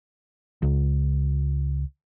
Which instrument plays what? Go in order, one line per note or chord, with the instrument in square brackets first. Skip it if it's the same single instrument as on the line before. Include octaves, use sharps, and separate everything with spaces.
[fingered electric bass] C#2